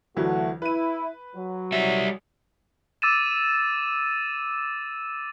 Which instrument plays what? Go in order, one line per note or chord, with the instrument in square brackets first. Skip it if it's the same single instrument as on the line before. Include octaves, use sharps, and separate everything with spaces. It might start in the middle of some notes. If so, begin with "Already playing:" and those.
[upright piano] D2 E3 F#3 [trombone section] A3 F#4
[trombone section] E4 [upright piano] B4 D#7
[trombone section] F#3
[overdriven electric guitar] G3 E5
[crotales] D6 E6 A6 D#7 E7